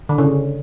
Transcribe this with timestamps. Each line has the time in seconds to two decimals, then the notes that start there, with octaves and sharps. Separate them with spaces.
0.09 D3
0.18 C#3